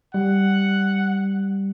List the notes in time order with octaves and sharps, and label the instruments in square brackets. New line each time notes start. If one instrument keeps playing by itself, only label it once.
[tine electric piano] G3 [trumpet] F#5